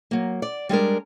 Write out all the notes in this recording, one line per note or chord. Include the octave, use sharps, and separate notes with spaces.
F#3 A#3
D5
G3 G#3 D4 A#4